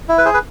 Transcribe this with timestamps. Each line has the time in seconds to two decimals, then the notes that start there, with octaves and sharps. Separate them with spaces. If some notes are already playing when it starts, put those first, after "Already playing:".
0.09 E4
0.18 B4
0.25 G#4 C5
0.34 B4